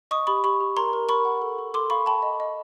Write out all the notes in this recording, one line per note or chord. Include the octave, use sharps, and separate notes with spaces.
D#5 C#6 D#6
G4 B5 C#6
G4 B5 C#6
G4
A#4 A#5 C6
A#4
A#4 B5 C#6
F#5
A4
A4
A4 C6 D6
F5 B5 C#6
G5 A5 B5
D#5
D#5